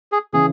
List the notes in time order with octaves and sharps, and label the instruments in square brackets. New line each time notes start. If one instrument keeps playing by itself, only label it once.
[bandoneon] G#4
[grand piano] C#3 E3 [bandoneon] G#4